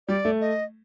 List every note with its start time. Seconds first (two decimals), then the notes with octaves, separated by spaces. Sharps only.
0.08 G3 D5
0.25 A3
0.41 D#5